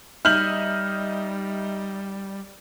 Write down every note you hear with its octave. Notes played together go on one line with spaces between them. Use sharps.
G3 D#4 D#5 E5 F6 G6 F#7